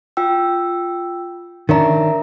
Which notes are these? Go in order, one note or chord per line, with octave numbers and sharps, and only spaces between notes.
F4 G5 E6
D#3 C#4 D4 A#4 E5 A#5